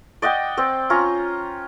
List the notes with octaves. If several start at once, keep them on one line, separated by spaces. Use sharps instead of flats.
D5 D#5 F#5 G5
C4 D5
C#4 F4 A#5